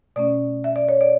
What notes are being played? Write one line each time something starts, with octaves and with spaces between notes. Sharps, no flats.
B2 A3 C#4 D5
E5
D5
C#5
D5